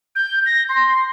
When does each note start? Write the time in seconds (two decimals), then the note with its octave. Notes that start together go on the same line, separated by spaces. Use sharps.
0.16 G6
0.46 A#6
0.69 C6